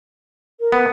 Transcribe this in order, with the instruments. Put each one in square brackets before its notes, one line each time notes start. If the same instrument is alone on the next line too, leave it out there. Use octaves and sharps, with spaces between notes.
[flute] A#4
[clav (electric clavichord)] B3